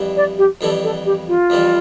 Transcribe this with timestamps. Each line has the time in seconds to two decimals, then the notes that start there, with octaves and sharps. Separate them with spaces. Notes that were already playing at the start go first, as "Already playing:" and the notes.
Already playing: F2 E3 G3
0.16 D5
0.38 G4
0.61 F2 E3 G3 A4
0.83 A4
1.05 G4
1.28 F4
1.50 F2 E3 G3